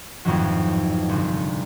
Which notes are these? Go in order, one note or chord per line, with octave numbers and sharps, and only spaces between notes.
A1 F2 G#2 D#3 F#3
G1 C2